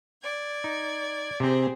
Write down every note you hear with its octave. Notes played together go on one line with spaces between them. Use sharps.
D5 G#6
D#4
C3 C4 G4 G#4 C5